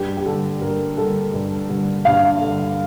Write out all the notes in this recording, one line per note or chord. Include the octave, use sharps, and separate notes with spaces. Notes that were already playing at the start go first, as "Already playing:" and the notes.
Already playing: G2 G4
G4
D3 G3 A4
G2 A#4
D3 G3 A4
G2
D3 G3
G2 F5
D3 G3